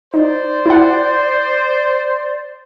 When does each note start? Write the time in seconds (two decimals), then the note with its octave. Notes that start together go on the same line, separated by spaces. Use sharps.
0.14 D#4 C5 D5
0.66 E4 F#5